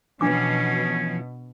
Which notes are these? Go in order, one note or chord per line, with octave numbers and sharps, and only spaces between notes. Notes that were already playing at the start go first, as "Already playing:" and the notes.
B2 E3 F3 C#4 D4 D6